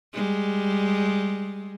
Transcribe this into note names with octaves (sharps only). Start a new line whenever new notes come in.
G3 G#3